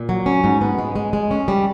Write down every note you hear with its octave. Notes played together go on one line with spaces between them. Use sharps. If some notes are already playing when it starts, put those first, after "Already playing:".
Already playing: A#2
F#3
C#4
G#2
B3
G#3
G#3
G#3
C#4
G3